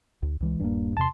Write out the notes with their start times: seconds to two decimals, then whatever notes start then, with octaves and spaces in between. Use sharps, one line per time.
0.22 D2
0.40 C#2 E3 G#3
0.60 D#1 G2 A#3
0.97 E2 C3 A5 C6